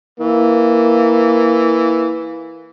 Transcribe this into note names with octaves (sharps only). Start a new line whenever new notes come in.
E3 A#3